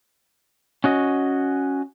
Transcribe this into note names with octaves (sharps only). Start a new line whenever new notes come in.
C#4 F#4 D#5